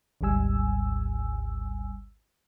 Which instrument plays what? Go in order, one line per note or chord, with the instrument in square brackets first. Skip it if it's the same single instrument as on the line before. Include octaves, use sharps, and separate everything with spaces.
[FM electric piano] G#1 D2 G#2 G3 G#5 E6